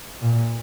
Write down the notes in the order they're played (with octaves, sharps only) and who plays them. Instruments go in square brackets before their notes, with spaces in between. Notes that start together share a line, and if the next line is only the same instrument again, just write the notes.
[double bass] A#2